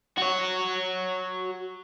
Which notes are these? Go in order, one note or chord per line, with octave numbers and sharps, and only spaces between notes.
F#4 C#5